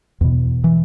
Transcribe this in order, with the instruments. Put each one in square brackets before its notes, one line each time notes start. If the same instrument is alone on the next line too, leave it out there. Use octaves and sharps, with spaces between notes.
[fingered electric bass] E2 B2
E3